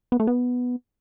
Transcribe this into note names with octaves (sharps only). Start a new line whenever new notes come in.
B3
A3
B3